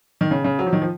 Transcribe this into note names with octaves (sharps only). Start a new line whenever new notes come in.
D#3
C#3
C#3
F#3
F3
D#3
F3